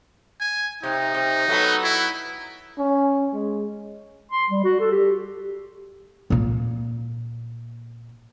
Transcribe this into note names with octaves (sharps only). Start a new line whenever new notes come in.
G#5
C3 D#4
C3
F#3 A3 B3
E4
C#4
G#3
C6
G3
F#4
A4
G4
A#2 A#3